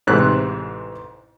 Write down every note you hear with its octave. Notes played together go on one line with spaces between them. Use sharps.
A1 G#2 C3 C5 F#6